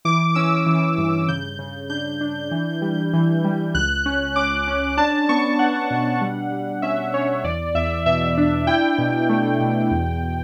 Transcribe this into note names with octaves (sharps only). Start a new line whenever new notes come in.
E3 D6
C#4 E6
E3
G2
C#3 G6
C#3
D4 G6
D4
E3
G3
E3
G3
C#2 F#6
C#4
C#4 D6
C#4
D4 A5
B3 C#6
D4 F#5
B2
G3
G3
C#4 E5
C#4 C#5
E2 D5
E2 E5
B2 E5
D4
E4 G5
B2
A3
B2
E2